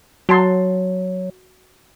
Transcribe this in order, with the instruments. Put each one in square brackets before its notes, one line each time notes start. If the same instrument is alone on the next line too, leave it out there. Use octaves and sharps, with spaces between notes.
[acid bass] F#3 [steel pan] F#4 A5 C6